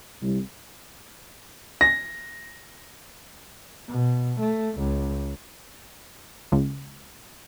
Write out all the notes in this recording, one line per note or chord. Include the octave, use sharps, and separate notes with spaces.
C2
A#6
B2
A3
C#2
C#2